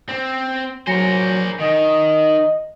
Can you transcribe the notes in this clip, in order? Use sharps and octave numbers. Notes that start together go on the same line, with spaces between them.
C4
F#3 A#4 C5 G#5 A#6 C#7
D#3 D#5